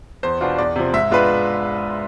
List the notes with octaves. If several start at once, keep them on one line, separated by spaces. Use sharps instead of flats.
E2 C5
B2 B3 D4 F4
E2 D5
C3 F3
G#2 E5
G#3 B3 D4 F4 B4